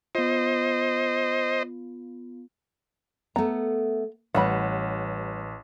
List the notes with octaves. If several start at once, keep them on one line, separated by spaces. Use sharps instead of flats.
B3 F4 C5 D#5
A3 B3 A#5
A1 G3 B4 C#5 F#5 B5